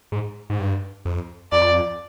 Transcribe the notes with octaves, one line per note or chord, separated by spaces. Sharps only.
G#2
G#2
G2
F2
F2 D5